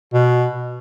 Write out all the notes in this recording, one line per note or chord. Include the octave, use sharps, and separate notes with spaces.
B2